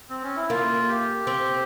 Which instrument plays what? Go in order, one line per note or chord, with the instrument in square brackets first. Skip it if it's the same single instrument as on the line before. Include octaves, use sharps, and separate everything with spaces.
[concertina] C4
C#4
E4
[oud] A#3 [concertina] F4
[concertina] G4
[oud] C4